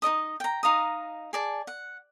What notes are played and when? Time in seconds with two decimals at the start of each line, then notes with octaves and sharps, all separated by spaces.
0.02 D#4 A#4 D#5 D#6
0.40 G5 A#5
0.63 D#4 F5 A#5 D#6
1.33 G#4 D5 A5
1.67 F#5